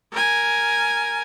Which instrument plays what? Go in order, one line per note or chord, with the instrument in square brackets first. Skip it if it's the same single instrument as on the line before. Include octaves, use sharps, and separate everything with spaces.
[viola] A#4 G#5